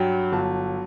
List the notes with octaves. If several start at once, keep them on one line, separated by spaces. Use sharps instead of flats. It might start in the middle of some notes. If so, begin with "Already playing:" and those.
Already playing: G2 F#3 G5
G1 A5